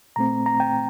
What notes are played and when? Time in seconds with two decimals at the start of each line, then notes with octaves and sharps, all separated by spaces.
0.16 A#2 A3 C4 A#5
0.46 A#5
0.60 G5